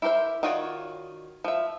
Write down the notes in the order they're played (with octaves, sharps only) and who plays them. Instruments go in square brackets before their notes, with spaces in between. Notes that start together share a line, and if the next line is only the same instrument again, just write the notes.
[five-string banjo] E4 G4 A#4 C5 E5
D#3 F4 F#4 C#5 D5
F3 E5